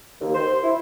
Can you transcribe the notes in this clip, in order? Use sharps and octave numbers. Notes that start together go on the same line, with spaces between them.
D#2
C5
E4